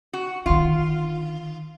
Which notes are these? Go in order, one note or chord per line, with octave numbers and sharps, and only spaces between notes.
F#4
D3 D#3 F4